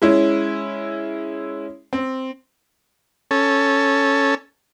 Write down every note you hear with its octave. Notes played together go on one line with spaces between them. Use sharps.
G#3 C#4 E4
C4
C#4 A4